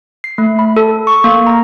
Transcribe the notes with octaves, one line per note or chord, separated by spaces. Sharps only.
C7
A3
B5
A4
C#6
A#3
A#5